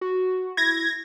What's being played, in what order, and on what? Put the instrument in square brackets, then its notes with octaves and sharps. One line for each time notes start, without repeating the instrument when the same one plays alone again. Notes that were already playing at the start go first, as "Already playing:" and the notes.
[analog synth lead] F#4
[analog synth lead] E4 [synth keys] G#6 A#6